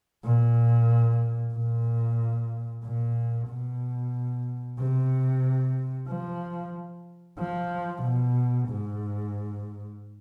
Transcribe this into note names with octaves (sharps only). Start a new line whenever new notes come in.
A#2
A#2
A#2
B2
C3
F3
F3
B2
G#2